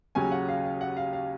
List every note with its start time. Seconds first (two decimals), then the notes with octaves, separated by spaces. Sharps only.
0.15 D#2 C#3 F#3 C#4 G#5
0.32 F#5
0.49 F5
0.65 F5
0.81 F#5
0.97 F5
1.13 F5